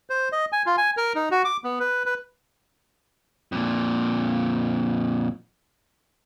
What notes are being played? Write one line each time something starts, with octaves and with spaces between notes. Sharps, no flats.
C5
D#5
G#5
F4
G#5
A#4
D#4
F#4
D6
B3
B4
B4
F2 A#2